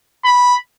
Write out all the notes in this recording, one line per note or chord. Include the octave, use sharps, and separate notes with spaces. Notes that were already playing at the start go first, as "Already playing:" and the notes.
B5